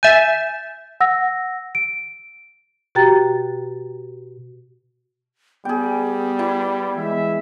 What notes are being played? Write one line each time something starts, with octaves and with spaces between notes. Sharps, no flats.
E5 G#5 G6 A6 E7
F#5 E6 A#6
D7
B2 F#4 G4 G5 A#5 A6
G3 B3 G#4 G5
E4
E3 G#3 E5